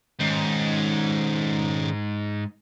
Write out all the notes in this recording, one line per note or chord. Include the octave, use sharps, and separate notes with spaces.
G#2 D#3 C#4